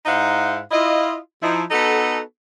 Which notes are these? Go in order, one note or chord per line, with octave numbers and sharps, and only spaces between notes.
G#2 D#4 E4 C5 F5 F#5
E4 F4 D#5
F3 D#4 E4
B3 D#4 F#4 A4